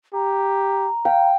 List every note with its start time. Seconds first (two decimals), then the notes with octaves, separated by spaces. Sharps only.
0.14 G4 A#5
1.05 F5 G5